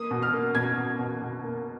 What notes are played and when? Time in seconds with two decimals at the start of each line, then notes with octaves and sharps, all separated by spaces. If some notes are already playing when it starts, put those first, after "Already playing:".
Already playing: A#3 D#6
0.11 B2
0.22 F6
0.33 A#3
0.55 B2 G#6
0.77 B2
0.99 B2
1.22 B2
1.43 A#3